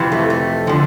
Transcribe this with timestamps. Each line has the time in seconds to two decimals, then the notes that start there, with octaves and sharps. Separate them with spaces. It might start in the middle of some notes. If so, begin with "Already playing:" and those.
Already playing: F2 C3 E3
0.12 A3
0.30 A3
0.67 D3 F3